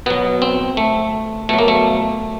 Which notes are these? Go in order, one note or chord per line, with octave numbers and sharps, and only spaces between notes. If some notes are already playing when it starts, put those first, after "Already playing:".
B2 F#3 B3
C4
A3
B2 F#3 A3
A#3
A3